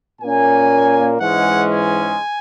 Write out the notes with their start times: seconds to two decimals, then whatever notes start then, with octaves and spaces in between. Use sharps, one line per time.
0.22 A#2 A#3 C#4 G#5
1.20 G#2 E3 G#3 C#4 F#5
1.71 G#5